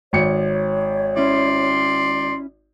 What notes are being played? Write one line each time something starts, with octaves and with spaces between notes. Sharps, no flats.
G#1 C#5 C#7
C#4 E4 D5 C6